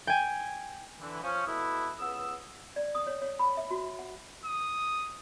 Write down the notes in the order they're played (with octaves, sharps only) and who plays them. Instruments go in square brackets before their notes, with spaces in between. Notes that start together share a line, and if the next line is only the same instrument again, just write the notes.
[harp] G5 G#5
[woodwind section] D3 E3
F3 C#4
B2 A3 B3 E4
C#2 B3 D#6 E6
[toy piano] D5
D#6
C#5
C#5
B5
E5
F#4
F#5
[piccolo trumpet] D#6